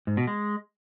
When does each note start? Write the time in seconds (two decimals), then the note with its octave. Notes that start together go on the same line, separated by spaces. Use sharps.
0.07 G#2
0.17 B2
0.27 G#3